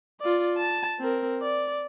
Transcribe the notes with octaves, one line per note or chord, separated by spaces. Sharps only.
F4 D5
A5
C4 A#4
D5